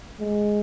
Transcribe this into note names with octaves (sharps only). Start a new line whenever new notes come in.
G#3